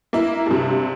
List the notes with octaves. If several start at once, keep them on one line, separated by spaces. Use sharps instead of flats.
A#3 E4
G2 C3